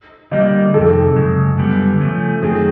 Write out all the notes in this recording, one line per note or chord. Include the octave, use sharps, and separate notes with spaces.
D3 G3 A#3 D4 D#5
F2 C3 D#3 A4
F#2 C#3 G#3
F#2 D3 G3 B3
C#3 F3 A3 C#4
F#2 D#3 F#3 A3 C4 G#4